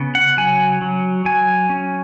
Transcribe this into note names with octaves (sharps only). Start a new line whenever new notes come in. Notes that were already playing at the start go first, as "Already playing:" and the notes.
Already playing: C#3 B3
F#5
F#3 G#5
F#3
F#3 G#5
C#4